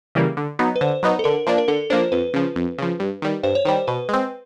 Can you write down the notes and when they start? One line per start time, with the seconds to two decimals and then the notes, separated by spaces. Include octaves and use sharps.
0.15 C#3 E3 G3 A#3
0.37 D3
0.59 F#3 B3 D#4
0.76 B4
0.81 D3 C5
1.03 F#3 B3 D#4
1.19 A4
1.24 D3 A#4
1.47 F3 A#3 D4
1.58 A#4
1.68 D3 A4
1.90 F3 A#3 D4 C5
2.12 F2 B4
2.34 C#3 F3
2.56 F2
2.78 C#3 F3
3.00 G2
3.22 D#3 G3
3.43 G2 C5
3.55 C#5
3.65 D#3 G3 C5
3.88 B2 B4
4.09 G#3 C4